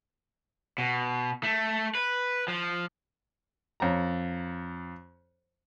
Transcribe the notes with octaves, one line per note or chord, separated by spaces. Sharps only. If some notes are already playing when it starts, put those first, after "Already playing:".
B2
A3
B4
F3
F2 C#5 A#5